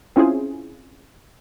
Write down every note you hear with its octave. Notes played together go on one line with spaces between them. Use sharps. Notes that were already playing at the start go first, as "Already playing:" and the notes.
C4 C#4 E4 F4 G#4 C5